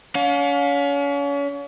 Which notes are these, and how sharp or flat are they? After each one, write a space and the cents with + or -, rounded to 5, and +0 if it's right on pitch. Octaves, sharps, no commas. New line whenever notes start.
C#4 +35 F5 +40